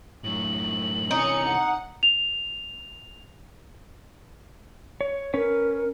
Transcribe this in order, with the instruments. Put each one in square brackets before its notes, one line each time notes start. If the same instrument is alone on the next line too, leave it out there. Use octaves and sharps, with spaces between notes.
[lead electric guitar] F#2 A2 [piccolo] F#7
[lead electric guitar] C3 E3 [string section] C#4 C#7 [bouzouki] D#4
[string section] F#5
[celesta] F7
[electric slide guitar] C#5
[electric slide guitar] C#4 B4 C#5 [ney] A#4